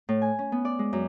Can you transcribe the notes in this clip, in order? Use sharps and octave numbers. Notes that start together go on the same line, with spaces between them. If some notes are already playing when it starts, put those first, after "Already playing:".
A2
G#5
C#4
B3
D5
G#3
F#2